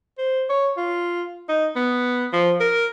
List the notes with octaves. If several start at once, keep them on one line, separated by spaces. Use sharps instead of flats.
C5
C#5
F4
D#4
B3
F3
A#4